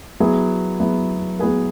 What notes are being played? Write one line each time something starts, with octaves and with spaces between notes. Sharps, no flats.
F#3 B3 E4 G#4 B4
F#3 B3 E4 G#4 B4
F#3 B3 E4 G#4 B4